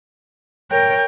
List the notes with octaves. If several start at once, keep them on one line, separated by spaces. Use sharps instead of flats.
A#4 C#5 G5